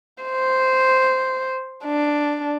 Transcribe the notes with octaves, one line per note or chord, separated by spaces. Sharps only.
C5
D4